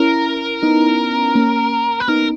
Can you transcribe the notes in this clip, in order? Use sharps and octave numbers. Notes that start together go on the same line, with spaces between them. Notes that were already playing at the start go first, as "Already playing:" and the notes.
Already playing: C#4 E4 A#4
B3 D#4
A#3 C#4
B4
B3 D#4 A#4